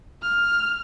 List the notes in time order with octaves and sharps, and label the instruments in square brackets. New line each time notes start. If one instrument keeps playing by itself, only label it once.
[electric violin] F6